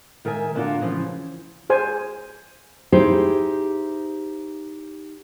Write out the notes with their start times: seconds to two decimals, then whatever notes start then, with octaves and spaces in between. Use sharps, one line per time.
0.25 D#3 A#4 E5 G#5
0.55 D3 A3 A#3 D4 F4 F#4
0.80 C#3 E3 F3 C#4
1.70 G#4 C5 G#5
2.92 D#4 E4 G4 G#4 C5